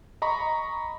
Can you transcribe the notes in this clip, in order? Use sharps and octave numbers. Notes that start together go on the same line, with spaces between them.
D#5 A#5 B5 C#6